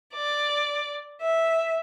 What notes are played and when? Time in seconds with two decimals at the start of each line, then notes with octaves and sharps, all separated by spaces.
0.14 D5
1.22 E5